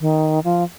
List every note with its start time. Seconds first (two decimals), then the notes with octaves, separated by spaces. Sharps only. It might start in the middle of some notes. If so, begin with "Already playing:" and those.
0.01 D#3
0.44 F3